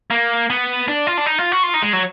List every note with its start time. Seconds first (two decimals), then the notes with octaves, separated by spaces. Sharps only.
0.11 A#3
0.50 B3
0.88 D4
1.07 F4
1.17 D4
1.26 D#4
1.38 F4
1.52 F#4
1.63 F4
1.74 D#4
1.82 G#3
1.93 F#3